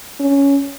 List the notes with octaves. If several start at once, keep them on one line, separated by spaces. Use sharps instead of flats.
C#4